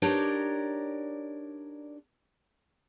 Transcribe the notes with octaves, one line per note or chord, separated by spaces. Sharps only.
D4 D#4 G4 A#4 C#5 D5